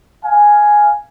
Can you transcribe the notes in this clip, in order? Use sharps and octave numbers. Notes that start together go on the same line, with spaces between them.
F5 G#5